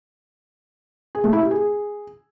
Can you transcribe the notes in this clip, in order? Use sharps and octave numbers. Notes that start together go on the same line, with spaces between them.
G#4
A3
E4
G4
G#4